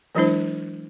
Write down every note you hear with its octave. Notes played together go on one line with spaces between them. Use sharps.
E3 F#3 G#3 D4 E4 C5